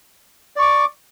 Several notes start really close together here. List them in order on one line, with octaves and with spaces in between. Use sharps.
D5 C#6 D6